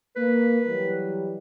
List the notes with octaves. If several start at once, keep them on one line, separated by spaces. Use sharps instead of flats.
A#3 B4
E3 F#3 G3